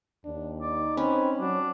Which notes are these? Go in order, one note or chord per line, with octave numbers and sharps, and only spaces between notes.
D#2 D4
D#4 D5
C4 C#4 B4
F#3 D4